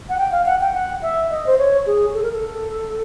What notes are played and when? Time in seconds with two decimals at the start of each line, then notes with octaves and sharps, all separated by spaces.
0.09 F#5
0.18 G5
0.31 F5
0.46 F#5
0.60 G5
0.74 F#5
1.02 E5
1.30 D#5
1.46 C5
1.58 C#5
1.86 G#4
2.14 A4
2.23 A#4
2.32 A4